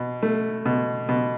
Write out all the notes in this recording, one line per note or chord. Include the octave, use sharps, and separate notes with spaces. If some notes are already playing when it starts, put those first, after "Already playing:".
Already playing: B2
A3
B2
B2